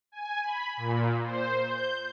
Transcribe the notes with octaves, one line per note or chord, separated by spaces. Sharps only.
G#5
B5
A#2
C5
G6